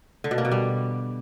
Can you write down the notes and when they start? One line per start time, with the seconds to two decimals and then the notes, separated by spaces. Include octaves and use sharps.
0.24 D3
0.31 B2
0.38 A#3
0.45 B2
0.51 G3